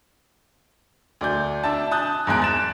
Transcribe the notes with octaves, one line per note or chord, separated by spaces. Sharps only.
D2 D5 G6
D4 E5 A5
G#5 A5 D#6 F#6 G6
E2 G#2 G#5 F#6 D7
A6 E7